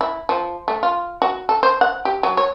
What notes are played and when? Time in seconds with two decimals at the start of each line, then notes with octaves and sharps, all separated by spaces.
0.01 E4
0.29 F3
0.68 A3
0.83 F4
1.22 F#4
1.49 A4
1.63 C5
1.81 F#5
2.05 G4
2.23 F#3
2.37 C#5